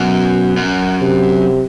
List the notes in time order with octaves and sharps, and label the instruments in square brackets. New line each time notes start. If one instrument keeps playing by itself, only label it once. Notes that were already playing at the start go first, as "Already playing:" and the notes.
Already playing: [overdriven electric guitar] F#2 [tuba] B2
[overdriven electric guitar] F#2
[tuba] C3